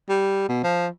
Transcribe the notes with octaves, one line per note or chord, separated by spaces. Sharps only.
G3
B2
F3